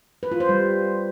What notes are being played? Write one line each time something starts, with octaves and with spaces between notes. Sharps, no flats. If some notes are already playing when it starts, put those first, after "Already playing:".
B4
F4
C5
G3